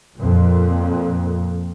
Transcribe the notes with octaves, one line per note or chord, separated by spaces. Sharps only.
F2 A#2